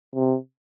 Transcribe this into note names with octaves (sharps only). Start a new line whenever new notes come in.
C3